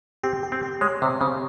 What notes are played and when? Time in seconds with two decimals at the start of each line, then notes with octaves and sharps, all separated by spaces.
0.23 C4 G4
0.43 G4
0.52 C4
0.63 G4
0.81 G#3 C#5
1.02 C3 C4
1.21 C#3 C4